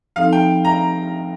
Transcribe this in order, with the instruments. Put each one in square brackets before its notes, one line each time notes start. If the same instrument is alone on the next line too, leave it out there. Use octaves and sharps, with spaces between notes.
[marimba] F3 C4 D#4 A4 [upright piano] F5
[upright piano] G5
A#5